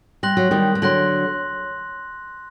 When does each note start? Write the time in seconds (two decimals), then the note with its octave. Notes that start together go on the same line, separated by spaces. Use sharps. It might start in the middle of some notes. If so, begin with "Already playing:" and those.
0.23 G3 C6 F#6 A#6 F#7
0.37 F#3
0.51 D#3 G3
0.75 G3
0.82 D3 F#3 C6 F#6 A#6 F#7